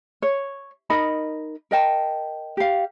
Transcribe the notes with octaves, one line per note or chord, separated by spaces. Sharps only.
C#5
D#4 A#4 D#5 B5
A#4 D#5 G5 A5
G4 F5